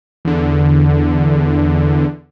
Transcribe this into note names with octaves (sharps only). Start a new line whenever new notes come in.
E2 D3